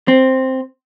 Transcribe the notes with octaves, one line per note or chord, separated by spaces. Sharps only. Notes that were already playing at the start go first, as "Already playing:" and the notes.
C4